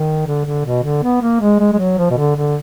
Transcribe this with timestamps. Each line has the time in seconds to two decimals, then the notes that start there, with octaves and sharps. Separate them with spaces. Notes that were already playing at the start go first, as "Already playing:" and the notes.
Already playing: D#3
0.26 D3
0.45 D3
0.65 B2
0.83 D3
1.03 B3
1.22 A#3
1.40 G#3
1.60 G#3
1.73 G#3
1.78 F#3
1.98 F3
2.10 B2
2.17 D3
2.36 D3